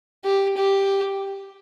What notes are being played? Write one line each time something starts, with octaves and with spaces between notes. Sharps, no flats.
G4
G4